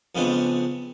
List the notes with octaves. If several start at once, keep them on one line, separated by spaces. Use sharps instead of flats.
F2 C#3 G#3 B3 C4 D4